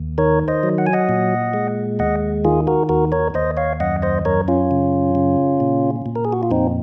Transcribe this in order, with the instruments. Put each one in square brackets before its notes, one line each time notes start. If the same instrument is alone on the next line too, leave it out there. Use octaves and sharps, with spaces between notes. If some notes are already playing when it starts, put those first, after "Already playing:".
Already playing: [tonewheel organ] D#2
D#3 A#4 C#5
C5 D#5
F#3
F#5
G#5
D#5 F#5
A#2
G#3
D#2 D#5 F#5
D#3 F4 G#4
F#4 A#4
D#2 F#4 A#4
A#4 C#5
D#2 C5 D#5
C#5 F5
F#2 D#5 F#5
C5 D#5
F#2 A#4 C#5
C#4 F4
C#3
C#3
A#2
A#2
A#4
G#4
F#4
F4
F2 C4 D#4